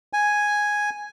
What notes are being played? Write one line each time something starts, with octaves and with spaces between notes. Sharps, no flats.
G#5